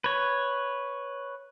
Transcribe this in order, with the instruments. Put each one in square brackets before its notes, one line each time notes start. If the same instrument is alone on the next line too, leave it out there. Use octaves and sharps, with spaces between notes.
[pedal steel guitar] B4 C#5